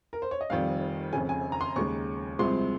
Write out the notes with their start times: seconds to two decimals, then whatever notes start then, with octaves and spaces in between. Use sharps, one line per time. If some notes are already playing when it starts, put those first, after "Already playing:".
0.13 A#4
0.22 C5
0.31 C#5
0.41 D#5
0.50 F1 F2 D#3 G3 F5
1.13 F1 F2 C#3 G#5
1.29 G#5
1.52 A#5
1.61 C6
1.76 D#2 C#3 G#3 C#6
2.39 C2 C3 F3 G#3 C6